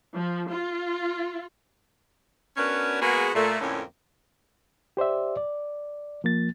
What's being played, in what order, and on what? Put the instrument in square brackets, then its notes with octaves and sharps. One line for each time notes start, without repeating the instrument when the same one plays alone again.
[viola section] F3
F4
[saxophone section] B3 C#4 D4 F#4 A#4 B4
G#3 A#3 B3 F#4 G#4
A#2 A3
F2 A2 D3 A#3 C#4
[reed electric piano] G4 C5 D5 E5
D5
F3 A#3 A6